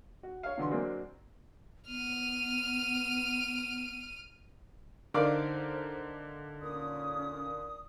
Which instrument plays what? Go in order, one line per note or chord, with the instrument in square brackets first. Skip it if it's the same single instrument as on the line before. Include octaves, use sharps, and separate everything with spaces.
[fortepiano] F#4
C#5 F5
B2 D3 E3 C6
F#3 G#3 A#3 C4 D4
[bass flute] B3 [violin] F6 D#7
[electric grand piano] D3 D#4 [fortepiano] A#4 D5 F5 [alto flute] C5
[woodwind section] A#2 D#6 [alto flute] C#4